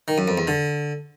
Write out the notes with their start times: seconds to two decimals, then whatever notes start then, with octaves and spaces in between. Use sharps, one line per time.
0.08 D#3
0.18 F#2
0.28 F2
0.38 E2
0.48 D3